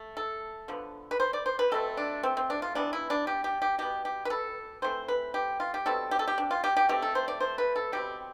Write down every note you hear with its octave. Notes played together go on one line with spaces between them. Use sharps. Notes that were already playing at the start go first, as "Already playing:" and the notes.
Already playing: A3
A4
D3 F3 B3
B4
C5
D5
C5
B4
B2 A3 C4 A4
D4
C4
C4
D4
F4
C3 E3 B3 D4
E4
D4
G4
G4
G4
B2 B3 G4
G4
B4
A4
E3 A3 C4 C5
B4
G4
F4
G4
B2 G3 C4 A4
G4
A4
G4
D4
F4
G4
G4
B2 A3 C4 G4
A4
C5
D5
C5
B4
A4
B2 G3 C4 G4